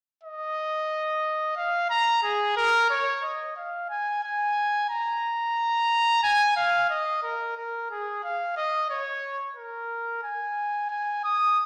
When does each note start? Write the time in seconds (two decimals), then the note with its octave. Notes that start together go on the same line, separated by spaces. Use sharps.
0.23 D#5
1.57 F5
1.90 A#5
2.23 G#4
2.57 A#4
2.90 C#5
3.23 D#5
3.56 F5
3.90 G#5
4.23 G#5
4.89 A#5
6.23 G#5
6.56 F5
6.90 D#5
7.23 A#4
7.57 A#4
7.90 G#4
8.23 F5
8.57 D#5
8.90 C#5
9.56 A#4
10.23 G#5
10.90 G#5
11.24 D#6